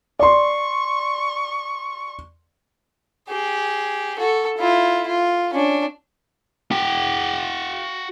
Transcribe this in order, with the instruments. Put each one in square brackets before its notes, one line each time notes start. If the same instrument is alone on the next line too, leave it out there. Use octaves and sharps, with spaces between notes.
[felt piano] D5 C6 [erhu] C#6
[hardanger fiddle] G4 G#4
F#4 A4
E4 F4
F4
C#4 D4
[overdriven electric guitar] F#4 G5